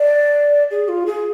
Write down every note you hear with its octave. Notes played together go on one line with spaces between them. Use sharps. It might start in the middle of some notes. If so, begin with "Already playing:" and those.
Already playing: D5
G#4
F4
G#4